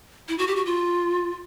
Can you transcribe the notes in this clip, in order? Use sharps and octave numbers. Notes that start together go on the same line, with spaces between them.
E4
F#4
G4
F#4
F4